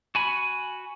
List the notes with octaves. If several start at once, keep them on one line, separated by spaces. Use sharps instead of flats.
F#4 G#5 B5